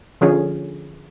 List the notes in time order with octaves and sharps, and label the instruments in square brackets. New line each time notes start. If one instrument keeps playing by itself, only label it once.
[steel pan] D3 F3 C#4 G#4